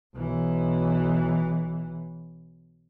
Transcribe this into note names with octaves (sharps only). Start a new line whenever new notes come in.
B1 E3